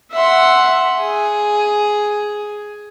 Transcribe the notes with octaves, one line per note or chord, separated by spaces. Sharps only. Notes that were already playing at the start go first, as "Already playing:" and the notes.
E5 F#5 C6
G#4